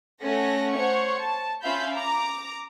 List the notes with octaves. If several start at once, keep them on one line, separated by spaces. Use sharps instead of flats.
A3 C#4 A4 F#5 A#6
C5 C#5 F#5 C#6
A5
C#4 F4 E5 F5 B5 G6
A#5 D6